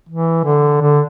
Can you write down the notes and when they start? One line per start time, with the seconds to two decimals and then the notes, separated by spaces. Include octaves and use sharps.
0.09 E3
0.45 D3
0.82 D3